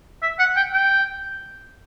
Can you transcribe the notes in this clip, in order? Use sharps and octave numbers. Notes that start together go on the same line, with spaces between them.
E5
F#5
G5
G5